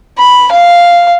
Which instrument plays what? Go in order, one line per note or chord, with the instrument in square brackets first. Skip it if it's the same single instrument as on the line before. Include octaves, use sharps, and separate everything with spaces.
[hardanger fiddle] B5
F5